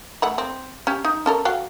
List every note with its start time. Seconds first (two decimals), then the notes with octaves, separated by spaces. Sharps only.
0.22 A3 F#5 B5
0.38 C4
0.87 C#4 G4
1.05 D#4
1.26 C#4 A4 A#4
1.45 F#4 F5 G5